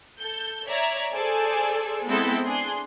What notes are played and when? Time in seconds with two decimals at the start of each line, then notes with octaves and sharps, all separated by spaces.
0.20 A4 G6
0.67 C#5 D5 E5 A#5 G#6
1.13 G#4 A4 C5 D5 G#5 A5
2.07 G#3 B3 C4 E4 A4
2.45 D4 G#4 C6